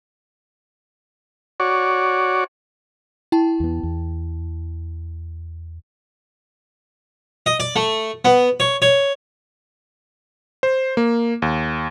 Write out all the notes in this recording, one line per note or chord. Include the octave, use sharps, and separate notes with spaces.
F#4 C#5 D5
E4 G5 A5
E2 B3
E2
D#5
D5
A3
B3
C#5
C#5
C5
A#3
D#2